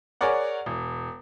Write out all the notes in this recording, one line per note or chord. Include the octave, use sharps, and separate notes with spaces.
G#4 A#4 C#5 D5 F#5
E1